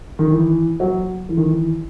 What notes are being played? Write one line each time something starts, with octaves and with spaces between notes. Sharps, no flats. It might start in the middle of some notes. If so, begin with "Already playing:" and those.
D#3
E3
F#3
E3
D#3
E3